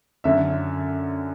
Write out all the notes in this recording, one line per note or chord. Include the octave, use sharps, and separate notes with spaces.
F#2 D3 E5